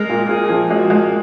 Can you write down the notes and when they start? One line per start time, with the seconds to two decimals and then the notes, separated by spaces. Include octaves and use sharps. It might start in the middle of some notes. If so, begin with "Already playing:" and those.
Already playing: G#3 A#4
0.09 A#2
0.29 A#2 G#4
0.49 F3
0.70 G#3 F#4
0.90 G#3